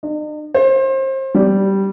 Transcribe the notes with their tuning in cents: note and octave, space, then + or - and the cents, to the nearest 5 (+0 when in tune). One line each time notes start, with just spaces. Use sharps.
D#4 -45
C5 +30
G3 -10